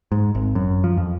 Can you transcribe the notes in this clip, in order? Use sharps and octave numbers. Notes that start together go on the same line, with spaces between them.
G#2
G#1
F#2
F3
F2